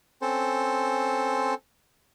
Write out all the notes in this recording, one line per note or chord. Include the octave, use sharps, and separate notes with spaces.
C4 C#4 A4 C5